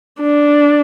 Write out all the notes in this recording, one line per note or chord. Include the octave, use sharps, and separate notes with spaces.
D4